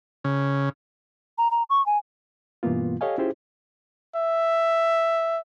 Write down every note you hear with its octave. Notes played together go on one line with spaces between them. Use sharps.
C#3
A#5
A#5
C#6
G#5
G2 B2 E3 A#3 B3 F4
G4 A4 C#5 D#5 F5 G#5
C#4 E4 F4 G4 G#4 C5
E5